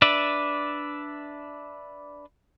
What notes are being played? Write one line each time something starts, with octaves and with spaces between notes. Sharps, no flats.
D4 B4 D5 E5